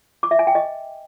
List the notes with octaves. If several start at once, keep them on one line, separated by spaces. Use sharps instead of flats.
D6
E5
G#5
G5
D#5